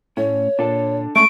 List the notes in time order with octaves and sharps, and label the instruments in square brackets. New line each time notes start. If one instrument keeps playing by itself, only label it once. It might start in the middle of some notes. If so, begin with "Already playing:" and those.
[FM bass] A2 [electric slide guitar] A3 C#4 [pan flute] C#5
[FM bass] A#2 [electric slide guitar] D4 A4 A5
[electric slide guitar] G#3 C#4 D4 [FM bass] A3 [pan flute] C#6 [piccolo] D7